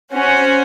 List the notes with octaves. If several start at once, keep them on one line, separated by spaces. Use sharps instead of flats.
C#4 F#4 C5 F#5